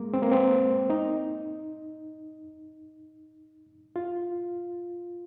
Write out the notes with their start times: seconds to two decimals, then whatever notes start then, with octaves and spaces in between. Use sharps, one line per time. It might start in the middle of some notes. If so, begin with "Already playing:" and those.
Already playing: G#3 A#3
0.14 C4
0.22 A#3
0.31 C4
0.90 D#4
3.96 F4